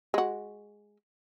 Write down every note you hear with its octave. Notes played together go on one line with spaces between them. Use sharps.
G#3 F#4